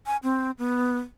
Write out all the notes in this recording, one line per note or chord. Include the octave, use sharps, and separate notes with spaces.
G#5
C4
B3